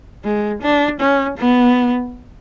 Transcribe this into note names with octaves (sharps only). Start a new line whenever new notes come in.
G#3
D4
C#4
B3